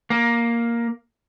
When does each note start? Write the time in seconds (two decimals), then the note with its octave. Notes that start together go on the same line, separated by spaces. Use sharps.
0.10 A#3